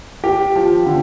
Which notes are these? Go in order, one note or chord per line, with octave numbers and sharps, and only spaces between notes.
G4
F3
D3